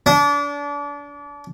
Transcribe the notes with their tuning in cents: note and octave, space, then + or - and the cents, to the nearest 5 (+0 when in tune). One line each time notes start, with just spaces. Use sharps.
D4 -30